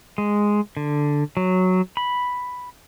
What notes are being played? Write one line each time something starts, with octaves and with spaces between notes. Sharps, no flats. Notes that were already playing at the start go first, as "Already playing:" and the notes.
G#3
D3
F#3
B5